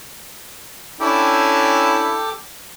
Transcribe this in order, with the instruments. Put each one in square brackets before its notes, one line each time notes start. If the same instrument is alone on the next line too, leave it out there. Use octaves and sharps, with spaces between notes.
[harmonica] C#4 D4 E4 [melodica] G4 A4 G5